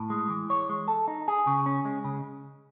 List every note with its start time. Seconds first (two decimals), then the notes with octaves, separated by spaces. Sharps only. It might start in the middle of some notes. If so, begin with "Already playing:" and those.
Already playing: A2
0.10 G#3
0.30 E3
0.50 C#5
0.69 G#3
0.88 A4
1.08 D#4
1.28 G#4
1.47 C#3
1.66 C#4
1.85 G#3
2.05 C#3